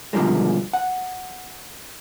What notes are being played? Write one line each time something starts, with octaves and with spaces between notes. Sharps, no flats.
B2 D3 D#3 F3 G3 G#3
F#5